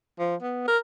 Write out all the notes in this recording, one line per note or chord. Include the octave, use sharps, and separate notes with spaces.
F3
B3
A#4